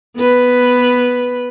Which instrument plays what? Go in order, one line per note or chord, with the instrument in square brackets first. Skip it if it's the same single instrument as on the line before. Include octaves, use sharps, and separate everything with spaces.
[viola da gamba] B3 B4